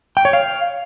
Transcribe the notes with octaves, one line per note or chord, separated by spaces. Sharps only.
G5
C#5
F5